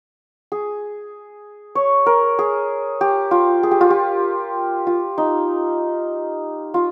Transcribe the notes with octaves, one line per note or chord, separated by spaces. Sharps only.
G#4
C#5
A#4
G#4
G4
F4
G#4
G4
F4
G4
F4
D#4
F4